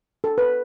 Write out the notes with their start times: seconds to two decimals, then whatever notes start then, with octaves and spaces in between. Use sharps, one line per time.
0.24 A4
0.38 B4